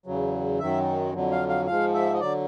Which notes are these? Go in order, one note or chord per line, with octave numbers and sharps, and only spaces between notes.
E2 C#3 F#3
F#2 D#3 F#3 E5
F2 D3 F#3
F5
F5
G#2 F3 F5
E5
D#5
D3 F#3 D5